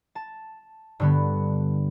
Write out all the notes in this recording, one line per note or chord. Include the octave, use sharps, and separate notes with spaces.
A5
G2 D3 B3